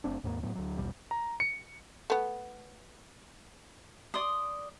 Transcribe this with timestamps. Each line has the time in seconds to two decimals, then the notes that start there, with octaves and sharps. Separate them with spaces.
0.04 F#1 A3 C4 D4
0.24 D#2 G#2 G#3 A#3
0.43 A2 F#3 B3
0.55 D2 F#3
0.78 A#1 D#2 B2 G3
1.11 A#5
1.40 C#7
2.10 A3 B3
4.14 D5 C6 D#6